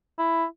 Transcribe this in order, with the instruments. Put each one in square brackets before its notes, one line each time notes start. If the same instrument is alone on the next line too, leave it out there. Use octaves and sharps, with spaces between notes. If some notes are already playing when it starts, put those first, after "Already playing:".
[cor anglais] E4